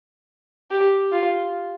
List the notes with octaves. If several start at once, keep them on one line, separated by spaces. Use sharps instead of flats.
G4
F4